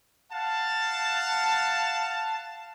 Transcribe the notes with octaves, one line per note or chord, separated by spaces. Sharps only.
F5 F#5 A5